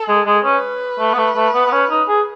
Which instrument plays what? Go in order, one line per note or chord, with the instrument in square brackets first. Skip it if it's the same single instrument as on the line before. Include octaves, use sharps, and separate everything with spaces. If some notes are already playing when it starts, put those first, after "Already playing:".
Already playing: [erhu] A4
[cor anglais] G#3
G#3
[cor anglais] C#4 [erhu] B4
[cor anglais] A3
B3
A3
A3
B3
B3
C#4
D#4
G#4